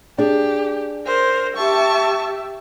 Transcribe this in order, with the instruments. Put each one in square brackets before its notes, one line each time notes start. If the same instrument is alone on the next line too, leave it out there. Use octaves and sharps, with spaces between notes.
[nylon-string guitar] D4 G#4 [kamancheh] G4
[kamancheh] A#4 C5
[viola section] G4 E5 [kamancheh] A5 C#6